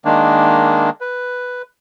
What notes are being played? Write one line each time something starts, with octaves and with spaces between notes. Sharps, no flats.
D#3 G#3 A#3 D4
B4